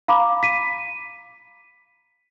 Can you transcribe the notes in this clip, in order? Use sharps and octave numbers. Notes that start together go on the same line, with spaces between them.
F5 A#5 B5 D6
B6 D#7